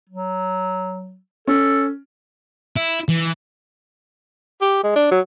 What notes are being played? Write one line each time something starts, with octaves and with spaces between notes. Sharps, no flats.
F#3
C#4 A4
E4
E3
G4
G#3
D4
F#3